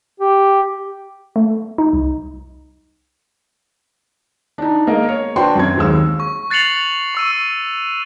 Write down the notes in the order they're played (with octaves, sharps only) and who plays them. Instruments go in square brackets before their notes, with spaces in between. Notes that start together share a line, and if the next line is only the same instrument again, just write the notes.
[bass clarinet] G4
[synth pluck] A3
D#4
C2
[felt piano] D4 D#4
G#3 A#3 A#4 D#5
C#5
D4 F#4 B4 C5 G5 C6
F#2 C4 G#6
D#2 G#3 E6
[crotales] C#6
F#6 A6 C7 C#7 F7 F#7
C#6 E6 D#7